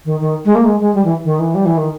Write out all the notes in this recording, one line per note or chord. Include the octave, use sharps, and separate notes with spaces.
D#3
D#3
G#3
A#3
G#3
G#3
G3
E3
D#3
E3
G3
E3
D#3